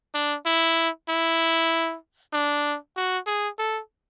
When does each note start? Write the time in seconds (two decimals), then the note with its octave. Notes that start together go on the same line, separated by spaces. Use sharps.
0.14 D4
0.45 E4
1.09 E4
2.33 D4
2.96 F#4
3.26 G#4
3.58 A4